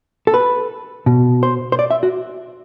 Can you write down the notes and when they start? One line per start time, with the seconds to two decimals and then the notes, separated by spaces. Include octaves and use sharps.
0.27 A4
0.34 B4
1.06 B2
1.43 C5
1.72 C5
1.79 D5
1.91 E5
2.03 F#4